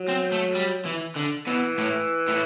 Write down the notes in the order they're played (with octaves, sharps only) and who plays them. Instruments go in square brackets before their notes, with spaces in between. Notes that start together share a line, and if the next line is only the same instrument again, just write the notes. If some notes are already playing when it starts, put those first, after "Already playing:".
Already playing: [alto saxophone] F#3
[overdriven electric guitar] C4
A3
G3
E3
D3
[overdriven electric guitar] B2 [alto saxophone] E3
[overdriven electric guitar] A2
A2